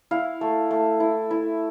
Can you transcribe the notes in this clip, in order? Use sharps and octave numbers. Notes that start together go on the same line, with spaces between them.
E4 F5
A3
A3
E4
E4